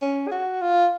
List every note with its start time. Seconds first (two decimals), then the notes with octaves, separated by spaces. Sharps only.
0.02 C#4
0.28 G#4
0.31 F#4
0.61 F4